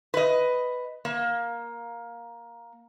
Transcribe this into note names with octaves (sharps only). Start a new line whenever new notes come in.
B4 D#5
A#3